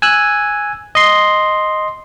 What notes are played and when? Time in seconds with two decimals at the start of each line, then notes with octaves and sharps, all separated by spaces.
0.02 G#5 E6 F#6
0.95 D#5 C6